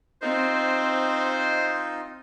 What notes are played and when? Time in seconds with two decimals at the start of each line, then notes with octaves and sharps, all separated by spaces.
0.22 C4 D#4 F4 C5 D#5